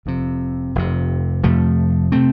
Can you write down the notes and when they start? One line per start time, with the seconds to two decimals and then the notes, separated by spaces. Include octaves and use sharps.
0.06 F1 F2 C3
0.75 F1 F2 C3
1.43 F1 F2 C3 F3 A3
2.12 C3 A3 C4